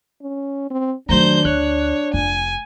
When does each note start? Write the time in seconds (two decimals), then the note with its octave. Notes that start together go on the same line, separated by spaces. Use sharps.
0.22 C#4
0.70 C4
1.09 F2 D#3 F#3 A3 D4 C5 A#5 G6
1.45 D2 C#5 F#6
2.14 F1 G#5